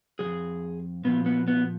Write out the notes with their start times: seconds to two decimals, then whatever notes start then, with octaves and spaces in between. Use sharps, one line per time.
0.19 F3 G#4
0.23 F2
1.04 A#2 F3 B3
1.26 B3
1.48 B3